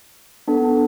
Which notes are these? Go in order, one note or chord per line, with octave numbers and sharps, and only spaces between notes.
B3 D4 A4